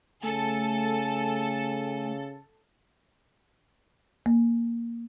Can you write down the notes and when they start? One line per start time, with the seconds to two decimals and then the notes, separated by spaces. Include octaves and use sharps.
0.23 C#3 A3 A4 G#5
4.26 A#3